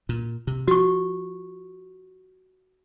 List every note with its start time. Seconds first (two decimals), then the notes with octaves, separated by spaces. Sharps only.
0.09 A#2
0.47 C3
0.68 F3 F#4 C#6